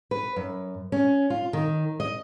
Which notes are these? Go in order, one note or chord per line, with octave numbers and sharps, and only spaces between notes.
B4
F#2
C#4
F4
D#3
D#5